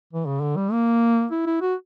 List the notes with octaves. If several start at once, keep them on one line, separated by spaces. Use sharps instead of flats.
E3
C#3
D3
G3
A#3
E4
E4
F#4